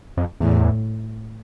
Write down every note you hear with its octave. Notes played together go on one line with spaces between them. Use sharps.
F2
E2 A2